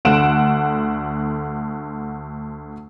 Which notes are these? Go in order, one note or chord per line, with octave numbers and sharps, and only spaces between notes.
D2 D3 F#5 D7 E7